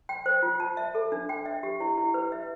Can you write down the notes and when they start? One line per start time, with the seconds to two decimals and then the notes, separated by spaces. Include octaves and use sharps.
0.09 G5
0.26 C5
0.43 F4
0.60 A5
0.77 E5
0.95 A4
1.12 D4
1.29 G5
1.46 E5
1.63 G4
1.80 E4
1.98 E4
2.14 B4
2.32 E5